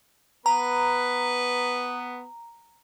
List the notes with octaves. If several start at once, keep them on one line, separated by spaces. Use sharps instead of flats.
B3 B4 A#5